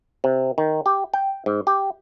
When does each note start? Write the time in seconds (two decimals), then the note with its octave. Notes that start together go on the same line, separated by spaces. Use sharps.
0.24 C3
0.58 D#3
0.86 G4
1.14 G5
1.46 G#2
1.67 G4